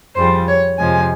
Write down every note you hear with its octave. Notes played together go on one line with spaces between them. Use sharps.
F2 C#3 G3 C5
C#5
F2 C3 F3 G#3 G#5